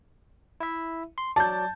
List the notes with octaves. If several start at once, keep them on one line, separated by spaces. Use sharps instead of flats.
E4 E5
C6
F#3 D5 A5 G6